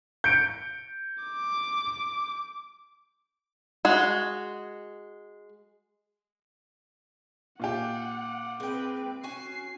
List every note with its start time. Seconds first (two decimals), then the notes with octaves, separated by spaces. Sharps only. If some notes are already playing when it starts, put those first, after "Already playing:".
0.24 G6 C#7 D7
1.23 D6
3.85 G#3 F#4
7.60 A#2 F4 G4 F#5
8.60 G#3 C4 B4 G5
9.23 C#4 F#4 G#5 C7